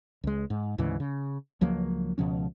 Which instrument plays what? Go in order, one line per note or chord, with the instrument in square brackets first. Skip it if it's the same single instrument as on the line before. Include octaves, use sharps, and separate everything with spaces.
[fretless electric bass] C#2 G#3
G#2
D2 G#2 C#3 E3
C#3
C#2 F3 F#3 A#3
C#2 B2 F3 C#4